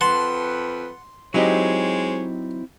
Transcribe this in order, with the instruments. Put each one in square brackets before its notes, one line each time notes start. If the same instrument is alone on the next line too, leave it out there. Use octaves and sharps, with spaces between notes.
[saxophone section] F2 B4 [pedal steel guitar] F#5 A5 [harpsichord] C6
[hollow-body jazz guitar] F#3 D#4 G4 [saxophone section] G#3 C5 C#5 [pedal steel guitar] C4 E4